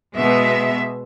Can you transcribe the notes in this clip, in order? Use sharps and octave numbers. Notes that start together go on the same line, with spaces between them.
B2 G#3 B3 E5